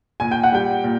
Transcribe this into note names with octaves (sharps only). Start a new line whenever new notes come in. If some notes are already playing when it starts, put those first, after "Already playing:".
A#2 G#5
G5
F#5
G3 G5
A#2